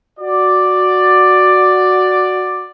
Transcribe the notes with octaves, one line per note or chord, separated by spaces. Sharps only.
F#4 D5